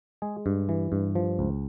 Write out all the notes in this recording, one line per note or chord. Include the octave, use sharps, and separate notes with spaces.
G#3 G#4
G2
E3
G2
F3
C#2